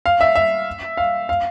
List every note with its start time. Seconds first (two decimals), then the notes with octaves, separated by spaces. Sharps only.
0.06 F5
0.21 E5
0.35 E5
0.97 F5
1.29 F5